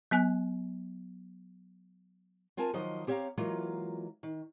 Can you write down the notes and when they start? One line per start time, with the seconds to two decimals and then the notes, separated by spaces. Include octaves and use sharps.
0.11 F#3 B3 G#5 F#6
2.57 C4 F4 A#4 G#5 A5
2.73 D#3 F3 F#3 C5 D#5
3.07 C4 G4 C#5 E5 F5 A#5
3.37 E3 F#3 G#3 A#3 F4
4.23 D#3